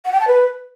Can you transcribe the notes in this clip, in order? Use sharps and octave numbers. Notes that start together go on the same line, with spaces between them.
F#5
G5
A5
B4